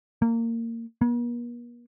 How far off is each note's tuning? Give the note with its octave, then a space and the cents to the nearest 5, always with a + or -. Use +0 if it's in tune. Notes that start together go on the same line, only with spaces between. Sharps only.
A#3 -20
A#3 +45